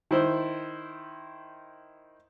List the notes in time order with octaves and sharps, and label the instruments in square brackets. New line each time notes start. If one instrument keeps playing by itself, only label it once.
[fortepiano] D#3 E4 C5